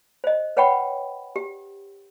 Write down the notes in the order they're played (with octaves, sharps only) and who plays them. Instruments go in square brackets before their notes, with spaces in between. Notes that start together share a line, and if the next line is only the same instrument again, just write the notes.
[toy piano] C5 D#5
B4 C#5 F#5 G5 B5 C#6
G4